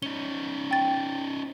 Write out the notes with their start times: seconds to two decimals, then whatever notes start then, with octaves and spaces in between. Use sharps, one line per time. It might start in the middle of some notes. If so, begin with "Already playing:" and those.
0.02 C#4 D#4 G7
0.71 G5 A6